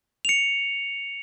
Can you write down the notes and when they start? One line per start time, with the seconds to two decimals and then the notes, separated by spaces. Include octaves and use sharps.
0.25 C#7 F7